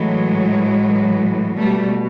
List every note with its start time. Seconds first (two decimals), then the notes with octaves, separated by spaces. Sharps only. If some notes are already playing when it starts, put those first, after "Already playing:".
Already playing: A2 E3 F#3 G#3
1.57 B2 G3 A3